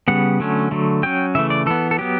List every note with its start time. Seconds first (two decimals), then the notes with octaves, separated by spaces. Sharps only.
0.08 C#3 G3 B3 F#5
0.40 D3 F#3 A3 C#4
0.71 D3 F#3 A3
1.03 F#3 C#4 G5
1.35 C#3 E3 A3 E5
1.50 D5
1.66 E3 B3 A4
1.91 A4
1.98 F#3 B3 G4